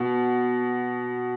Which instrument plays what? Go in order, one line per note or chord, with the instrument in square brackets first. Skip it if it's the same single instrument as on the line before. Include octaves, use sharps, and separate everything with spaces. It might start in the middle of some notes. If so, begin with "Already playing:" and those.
Already playing: [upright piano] B2